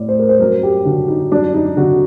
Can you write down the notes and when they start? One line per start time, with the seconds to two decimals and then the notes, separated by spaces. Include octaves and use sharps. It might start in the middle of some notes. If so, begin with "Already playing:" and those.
Already playing: A2 D5
0.08 C5
0.19 A#4
0.29 C5
0.40 F#2 A#4
0.63 G4
0.85 D3 F#4
1.08 D#4
1.32 F#2 D4
1.54 D#4
1.77 D3 F#4